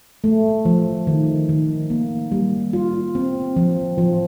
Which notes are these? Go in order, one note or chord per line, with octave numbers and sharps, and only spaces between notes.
A3
F3
D#3
D#3
A#3
G3
F4
C4
F3
F3